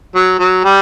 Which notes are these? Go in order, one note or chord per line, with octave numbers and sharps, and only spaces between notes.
F#3
F#3
G3